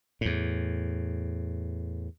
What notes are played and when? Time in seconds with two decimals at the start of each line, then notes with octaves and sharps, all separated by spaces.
0.21 E2 A2